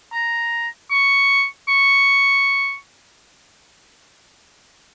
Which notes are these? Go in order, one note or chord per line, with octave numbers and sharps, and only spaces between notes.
A#5
C#6
C#6